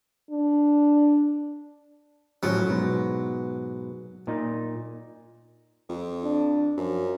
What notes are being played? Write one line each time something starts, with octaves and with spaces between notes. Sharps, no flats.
D4
A2 F3 F#3 C#4
G#2 B2
A#2 D#4
F2
D4
F#2 F3